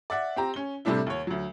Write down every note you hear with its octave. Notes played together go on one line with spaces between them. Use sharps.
D5 E5 F#5
C4 G4 A#5
C#4 G7
A2 C3 G3 A3 D4 E4
D#2 C#5
D2 F#3